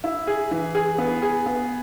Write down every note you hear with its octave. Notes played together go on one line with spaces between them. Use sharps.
E4
G#4
E3
G#4
B3
G#4
B3